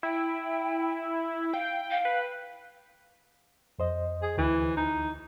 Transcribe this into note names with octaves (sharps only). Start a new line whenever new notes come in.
E4 G5
F5 G5
F5
B4
F2 C5 D#5
G#4
D2 E3
D#4